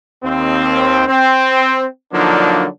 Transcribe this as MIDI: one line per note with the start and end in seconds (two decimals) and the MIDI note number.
0.23 1.03 39
0.23 1.03 60
1.07 1.85 60
2.12 2.65 50
2.12 2.65 53
2.12 2.65 54
2.12 2.65 58
2.12 2.65 62
2.12 2.65 63